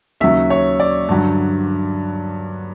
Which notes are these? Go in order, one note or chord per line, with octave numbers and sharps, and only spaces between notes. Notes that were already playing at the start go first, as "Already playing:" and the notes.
D#2 C#3 F#3 E5
C#5
D5
G2 D3 F#3